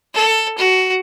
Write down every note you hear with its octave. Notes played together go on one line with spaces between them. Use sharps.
A4
F#4